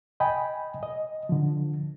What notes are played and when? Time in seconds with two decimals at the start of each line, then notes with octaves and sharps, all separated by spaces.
0.20 D#5 G5 G#5 B5
0.83 D#5
1.29 D3 F3